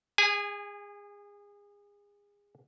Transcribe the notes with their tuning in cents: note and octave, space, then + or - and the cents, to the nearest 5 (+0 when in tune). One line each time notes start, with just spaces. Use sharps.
G#4 -30 G#5 +0